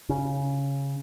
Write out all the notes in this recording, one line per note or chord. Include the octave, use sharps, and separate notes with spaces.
C#3